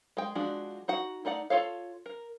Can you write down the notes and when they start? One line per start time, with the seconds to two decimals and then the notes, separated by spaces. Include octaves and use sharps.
0.17 G#3 G5
0.35 F3 G#3 D4 F#4
0.88 D#4 F#4 F#5
1.25 A3 D#4 D5 F#5
1.50 F4 A4 C#5 F5
2.06 A#4